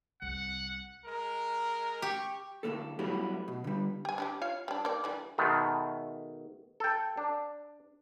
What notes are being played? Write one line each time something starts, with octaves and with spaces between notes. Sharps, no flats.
C2 F#5
G#3 A#4
G4 C#6
D2 A2 C3 A#3 A4
F#3 G3 A3 B3 E4 G4
B2
D3 G3
G4 G#5
D4 E4 G4
F4 C#5 F5
G3 D4
A#3 D#4 D5
D3 E3 G3
B2 D#3 G#3 A3
A4 G5
D4